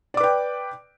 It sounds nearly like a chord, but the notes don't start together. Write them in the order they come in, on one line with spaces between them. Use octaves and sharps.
D5 D6 B4 G5